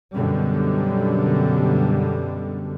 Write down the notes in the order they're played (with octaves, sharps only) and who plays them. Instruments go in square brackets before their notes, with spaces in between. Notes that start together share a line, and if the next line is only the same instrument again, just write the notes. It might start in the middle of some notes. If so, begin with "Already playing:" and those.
[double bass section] F#2 B2 D3 G3